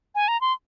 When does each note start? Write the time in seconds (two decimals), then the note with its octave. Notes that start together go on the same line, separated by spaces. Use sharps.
0.15 G#5
0.28 A#5
0.41 C6